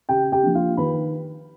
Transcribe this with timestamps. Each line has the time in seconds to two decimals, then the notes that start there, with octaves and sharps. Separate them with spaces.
0.09 C#3 G4 G5
0.32 G4 G5
0.43 F3 A#3 D4
0.55 F4 F5
0.77 D#3 B4 B5